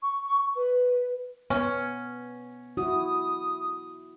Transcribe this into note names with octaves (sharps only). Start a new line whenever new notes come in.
C#6
B4
B3 C#4
E4 F#4 D#6